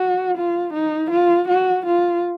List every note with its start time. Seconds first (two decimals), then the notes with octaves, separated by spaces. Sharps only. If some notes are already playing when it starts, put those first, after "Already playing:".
Already playing: F#4
0.37 F4
0.74 D#4
1.11 F4
1.48 F#4
1.86 F4